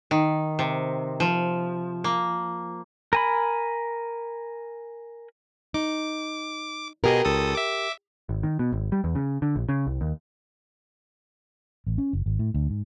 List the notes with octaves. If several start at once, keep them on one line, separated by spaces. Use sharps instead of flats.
D#3
C3
F3
A#3
A#4 G#5 B5
D#4 D6
B2 G4 G#4 A#4 D#5
C#2 A4 D#6
E5 D6
G#1
D#3
B2
G#1
G3
E2
C#3
D3
A#1
C#3
C2
D#2
A1
C#4
F#1
G#1
A2
D2
G#2